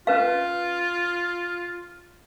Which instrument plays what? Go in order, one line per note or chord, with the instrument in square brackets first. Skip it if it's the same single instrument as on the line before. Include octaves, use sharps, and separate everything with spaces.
[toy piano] C#4 B4 F5 [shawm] F4